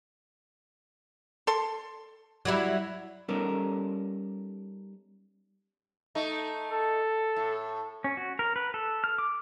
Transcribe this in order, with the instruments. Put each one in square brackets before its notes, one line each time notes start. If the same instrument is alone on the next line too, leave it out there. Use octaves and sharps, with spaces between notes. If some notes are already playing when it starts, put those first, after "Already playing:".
[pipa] A4 C6
[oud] F#3 G3 E4
[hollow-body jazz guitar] G3 B3 C#4 D#4 A4 A#4
[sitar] A3 D#4
[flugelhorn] A4
[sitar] A2
[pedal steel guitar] C#4
F#4
A#4
B4
A4
F6
D6